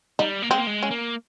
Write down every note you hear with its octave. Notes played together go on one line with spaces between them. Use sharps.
G3 D#4
A#3
G#3 C4
A#3
G#3
C#4
A#3